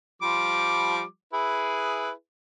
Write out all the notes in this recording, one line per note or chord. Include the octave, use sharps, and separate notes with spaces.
F3 G3 D6
E4 G#4 B4